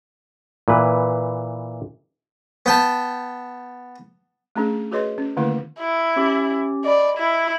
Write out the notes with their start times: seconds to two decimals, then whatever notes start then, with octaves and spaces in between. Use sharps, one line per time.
0.68 A#2 E3 B4
2.66 B3 G5 A5
4.56 A3 C#4 D4 G#4
4.91 F#4 G#4 B4 C#5 D#5 C6
5.18 C#4
5.37 D3 D#3 A3 A#3 E4 B4
5.79 E4
6.16 C#4 G4
6.84 D5 D#5 B5
7.18 E4